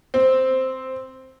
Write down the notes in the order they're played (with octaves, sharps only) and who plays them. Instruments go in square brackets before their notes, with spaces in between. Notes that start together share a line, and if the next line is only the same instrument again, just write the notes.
[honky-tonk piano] C4